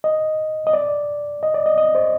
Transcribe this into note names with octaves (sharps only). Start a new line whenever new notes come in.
D#5
D#5
D5
D#5
D5
D#5
D#5
C5